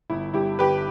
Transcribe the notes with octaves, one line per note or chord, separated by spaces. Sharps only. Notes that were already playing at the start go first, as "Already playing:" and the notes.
G1 E4
G2 E4 G4
G1 G4 B4